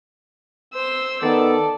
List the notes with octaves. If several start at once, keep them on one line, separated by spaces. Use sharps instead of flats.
C5 E6
D#3 B3 A4 D5